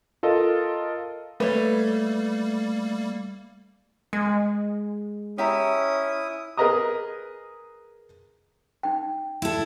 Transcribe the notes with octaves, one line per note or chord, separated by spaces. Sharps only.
F4 A4 A#4 D#5
G3 A3 A#3 B4 C#5
G#3 G#4
C#4 E4 G4 E5 A#5 D#6
G#4 A#4 B4 D#5 A#5 D#6
D#4 G5
E4 A4